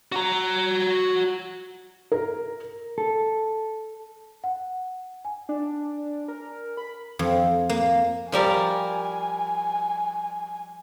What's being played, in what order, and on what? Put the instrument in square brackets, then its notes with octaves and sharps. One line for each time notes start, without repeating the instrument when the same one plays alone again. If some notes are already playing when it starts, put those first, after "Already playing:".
[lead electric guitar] F#4 A#5
[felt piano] A#4
[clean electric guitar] A4
[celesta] F#5
G#5
[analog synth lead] D4
A#4
B5
[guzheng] F2
A#3
[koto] F3 G3 A#4 [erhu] G#5